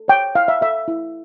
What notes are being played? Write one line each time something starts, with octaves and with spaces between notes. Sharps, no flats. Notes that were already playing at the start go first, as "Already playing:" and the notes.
Already playing: A4
C#5 G5
E4 F5
E5
A4 E5
E4